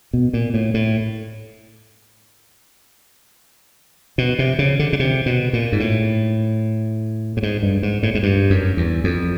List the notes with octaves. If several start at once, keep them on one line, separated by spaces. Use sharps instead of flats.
B2
A#2
A2
A2
B2
C3
C#3
D3
C#3
C3
B2
A#2
G#2
A2
A2
G#2
G2
G#2
A2
G#2
G2
F#2
E2
F2